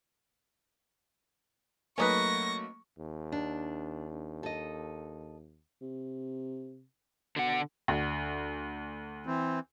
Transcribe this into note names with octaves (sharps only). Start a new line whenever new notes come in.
F#3 A3 A#3 C#4 D#4 B4 C#6 A#6
D#2
D4
A4 D#5
C3
B2 D3 F#5
D2
E3 C4